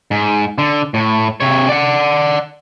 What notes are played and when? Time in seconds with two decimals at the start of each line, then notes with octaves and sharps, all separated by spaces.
0.11 G#2
0.58 D3
0.94 A2
1.40 C3 C#5
1.69 D5 F#5